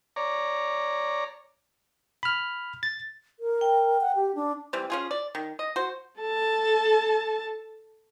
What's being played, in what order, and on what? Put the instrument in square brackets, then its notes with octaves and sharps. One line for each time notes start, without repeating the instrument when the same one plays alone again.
[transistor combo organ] C#5 D5 A#5
[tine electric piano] B5 F6
A6
[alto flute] A#4
[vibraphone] G5
[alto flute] F#5
G4
D4
[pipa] E3 G3 C4
C#4 F4 G#4
D5
D#3
D#5
F#4 C5
[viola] A4 A5